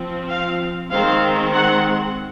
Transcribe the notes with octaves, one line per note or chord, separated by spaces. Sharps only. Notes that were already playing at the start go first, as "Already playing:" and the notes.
Already playing: F3 C4
F5
D#3 G#3 C4 F5
F#5